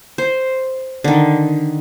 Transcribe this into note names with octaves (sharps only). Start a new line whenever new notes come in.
C5
D3 D#3